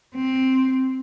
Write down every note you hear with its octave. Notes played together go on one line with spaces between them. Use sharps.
C4